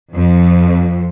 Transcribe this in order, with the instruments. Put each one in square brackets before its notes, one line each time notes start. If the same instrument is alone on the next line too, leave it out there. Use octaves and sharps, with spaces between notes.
[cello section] F2